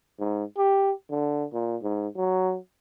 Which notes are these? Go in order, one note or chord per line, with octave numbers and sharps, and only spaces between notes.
G#2
G4
D3
A#2
G#2
F#3